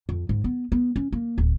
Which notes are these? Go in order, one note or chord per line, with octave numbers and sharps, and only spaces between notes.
F2
G#2
B3
B3
C#4
A#3
D1